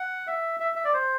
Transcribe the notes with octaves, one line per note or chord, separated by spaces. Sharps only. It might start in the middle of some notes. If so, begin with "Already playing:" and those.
Already playing: F#5
E5
E5
E5
D5
C5